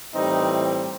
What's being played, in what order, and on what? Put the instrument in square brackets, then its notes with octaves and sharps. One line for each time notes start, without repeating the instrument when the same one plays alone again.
[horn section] A2 E3 G3 C4 D#4